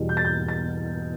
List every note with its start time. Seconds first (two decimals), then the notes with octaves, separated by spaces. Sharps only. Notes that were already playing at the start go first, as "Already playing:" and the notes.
Already playing: E2 B2 G3
0.09 G6
0.17 A6
0.25 G6
0.49 A6